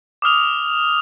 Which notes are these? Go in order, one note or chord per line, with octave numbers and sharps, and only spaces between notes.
D6 D#6 F6 F7